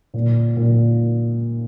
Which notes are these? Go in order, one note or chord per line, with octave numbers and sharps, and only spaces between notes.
A#2
A#2